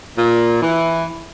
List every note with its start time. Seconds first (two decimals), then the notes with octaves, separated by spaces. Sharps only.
0.17 A#2
0.62 E3